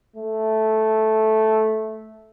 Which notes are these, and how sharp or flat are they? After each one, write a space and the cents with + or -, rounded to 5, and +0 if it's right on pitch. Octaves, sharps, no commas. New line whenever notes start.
A3 -5